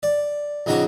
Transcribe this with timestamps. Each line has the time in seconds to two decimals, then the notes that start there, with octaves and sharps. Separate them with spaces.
0.03 D5
0.66 F2 C#3 D#4 F#4 C#5 D6